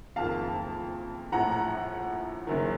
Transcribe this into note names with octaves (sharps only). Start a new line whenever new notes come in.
F#1 F2 D#3 F5 A5
A#1 A2 F3 F#5 A#5
F#5 A#5
F#1 F#2 D#3